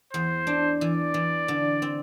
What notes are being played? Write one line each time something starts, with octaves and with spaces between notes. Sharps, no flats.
E2 C5
D4
E3 D5
E3
D3
C4